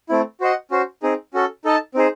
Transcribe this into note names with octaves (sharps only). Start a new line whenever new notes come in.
A3 C4 E4
F#4 C5 D#5 F#5
C#4 F#4 C5
C4 D#4 G#4
C#4 F#4 A4
D#4 A4 D#5 A5
C4 D#4 G#4 C5